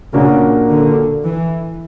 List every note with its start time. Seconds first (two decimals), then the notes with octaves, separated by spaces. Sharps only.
0.13 A#2 C#3 A#3 D4 F#4 A#4
0.69 D3
1.24 E3